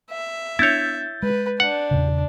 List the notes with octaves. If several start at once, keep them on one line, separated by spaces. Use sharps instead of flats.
E5
B3 D4 E4 C#5 G6 A6
G#3 B4
D4 F#5
E2 A#2 C#3